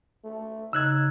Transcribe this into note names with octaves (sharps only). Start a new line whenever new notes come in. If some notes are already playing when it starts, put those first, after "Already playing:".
A3
C#3 D#4 E6 F#6 G#6